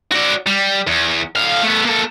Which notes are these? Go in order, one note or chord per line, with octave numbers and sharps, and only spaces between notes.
F#4 D5
G3
E2
A2 F5
A3 B3
A#3 A4